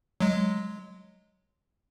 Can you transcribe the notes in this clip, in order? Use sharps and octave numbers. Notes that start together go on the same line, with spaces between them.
F#3 G#3